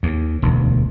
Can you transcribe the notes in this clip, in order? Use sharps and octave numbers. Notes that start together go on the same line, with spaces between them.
D#2
E1 D2